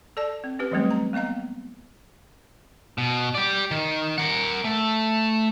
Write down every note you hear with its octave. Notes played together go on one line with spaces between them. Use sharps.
A4 D5 A5
C4
C#4 G4 B4
E3 F#3 G3 A3 C4 C#4
A#5
A#3 B3 D#5 F5 A#5
B2
G4 D5
D#3
A#4 F#5
A3